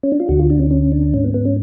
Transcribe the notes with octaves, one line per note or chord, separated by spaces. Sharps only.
C#4
D4
F4
D2 D3 F#4
F4
D4
C#4
C#4
D4
G#2 C#4
B3
B3
C#4